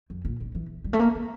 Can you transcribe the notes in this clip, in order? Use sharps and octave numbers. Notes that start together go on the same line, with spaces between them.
F2
A#2
D3
E3
G3
A3
A#3
A3